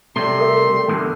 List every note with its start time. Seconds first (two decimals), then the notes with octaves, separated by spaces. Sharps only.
0.16 C3 G3 A3 C6
0.38 A4 A#4 E5
0.88 E2 A2 D3